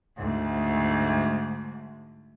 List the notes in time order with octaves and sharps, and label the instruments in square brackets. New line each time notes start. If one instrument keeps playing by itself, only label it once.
[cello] D2 G#2